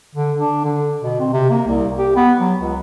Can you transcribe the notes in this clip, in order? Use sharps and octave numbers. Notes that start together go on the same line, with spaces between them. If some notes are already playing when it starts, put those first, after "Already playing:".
D3
D4
D3
B2
C4
C3
A#3
C2
G4
B3
F#3
C#2